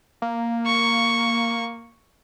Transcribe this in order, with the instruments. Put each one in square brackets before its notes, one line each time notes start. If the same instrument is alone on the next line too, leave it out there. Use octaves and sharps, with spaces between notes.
[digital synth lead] A#3
[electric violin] C#6